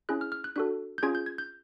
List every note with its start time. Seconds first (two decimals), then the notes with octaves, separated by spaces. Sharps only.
0.09 C#4 E4 G#4 F#6
0.21 F6
0.32 F6
0.44 F#6
0.56 D4 F#4 A4 F#6
0.98 G6
1.03 C#4 F4 G#4 G#6
1.15 G6
1.26 G#6
1.38 G6